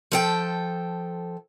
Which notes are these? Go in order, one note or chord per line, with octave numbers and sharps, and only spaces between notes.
F3 A4 G5